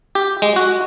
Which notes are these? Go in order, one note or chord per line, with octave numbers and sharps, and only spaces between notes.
G4
G#3
F#4